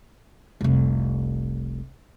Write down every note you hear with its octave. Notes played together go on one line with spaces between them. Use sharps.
F1 C2